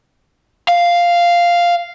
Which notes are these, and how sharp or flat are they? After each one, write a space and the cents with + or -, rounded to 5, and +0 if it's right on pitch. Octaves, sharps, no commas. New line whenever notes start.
F5 -5